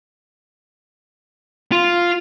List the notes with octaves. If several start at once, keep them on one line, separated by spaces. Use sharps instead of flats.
F4